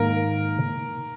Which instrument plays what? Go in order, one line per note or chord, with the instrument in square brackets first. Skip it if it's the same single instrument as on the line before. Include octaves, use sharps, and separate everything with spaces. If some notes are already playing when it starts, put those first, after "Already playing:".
Already playing: [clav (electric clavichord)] G#2 D#3 A#3 [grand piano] A#4